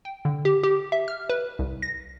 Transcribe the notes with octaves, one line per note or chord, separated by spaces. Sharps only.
G5
D3
G4
G4
E5
F6
B4
C2
A#6